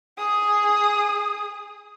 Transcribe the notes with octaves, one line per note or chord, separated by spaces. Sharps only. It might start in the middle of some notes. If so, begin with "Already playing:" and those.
G#4 D#6